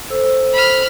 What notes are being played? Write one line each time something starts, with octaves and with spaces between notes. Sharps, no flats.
A4 C5 E6
B5 F6